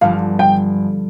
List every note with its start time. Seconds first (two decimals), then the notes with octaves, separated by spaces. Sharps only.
0.01 G1 G2 F3 F5
0.39 G5